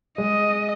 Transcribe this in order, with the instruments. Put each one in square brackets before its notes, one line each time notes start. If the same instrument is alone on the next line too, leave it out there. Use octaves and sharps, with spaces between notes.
[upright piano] G#3 [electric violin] D#5